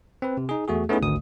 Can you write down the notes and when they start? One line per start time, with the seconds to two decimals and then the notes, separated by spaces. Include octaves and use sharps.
0.22 C4 B4
0.37 C3
0.49 D#4 G#4
0.68 E2 A3 F#4 G#4
0.89 A3 B3 C#4 D#4 E4 G#4
1.01 G#1 D2 D#6